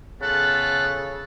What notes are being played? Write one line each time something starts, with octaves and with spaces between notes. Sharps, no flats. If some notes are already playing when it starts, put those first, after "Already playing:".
C#3 B3 F4 A4 F#6